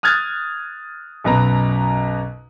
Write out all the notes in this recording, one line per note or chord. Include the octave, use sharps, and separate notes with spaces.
D#6 F6 F#6 G#6 A6
B1 F#2 B2 B4 A#5